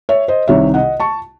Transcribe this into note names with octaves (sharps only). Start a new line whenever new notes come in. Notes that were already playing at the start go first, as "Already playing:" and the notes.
C#5 E5
C5 D#5
C2 C3 D#3 C#5 E5
D#5 F#5
A5 C#6